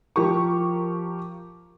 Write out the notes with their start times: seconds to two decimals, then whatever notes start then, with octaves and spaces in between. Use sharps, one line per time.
0.16 F3 G4 A#4 C#6